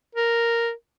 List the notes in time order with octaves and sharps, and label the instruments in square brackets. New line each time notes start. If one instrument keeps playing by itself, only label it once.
[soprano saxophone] A#4